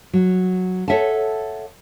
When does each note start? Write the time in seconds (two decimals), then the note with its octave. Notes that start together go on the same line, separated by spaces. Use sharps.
0.13 F#3
0.88 A4 C#5 E5 F#5 G#5 A5